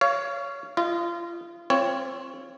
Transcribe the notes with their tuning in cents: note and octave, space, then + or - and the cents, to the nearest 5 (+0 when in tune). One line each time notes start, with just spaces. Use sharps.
C#5 +15 F5 -20
F4 -30 D#5 +0
C4 +15 F4 -15 C#5 +0